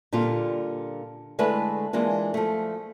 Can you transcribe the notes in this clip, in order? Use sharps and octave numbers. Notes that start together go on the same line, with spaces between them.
A#2 D3 G3 F4
D3 G#3 A3 E4 B4
E3 G#3 A#3 D4 F4
F3 A3